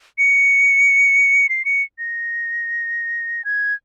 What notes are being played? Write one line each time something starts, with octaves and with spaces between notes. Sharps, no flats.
C#7
C7
C#7
A#6
G#6